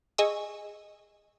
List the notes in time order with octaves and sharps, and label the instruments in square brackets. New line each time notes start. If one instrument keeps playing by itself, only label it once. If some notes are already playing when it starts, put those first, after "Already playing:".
[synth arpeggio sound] G#4 D#5 G#5 C#6 D#6 E6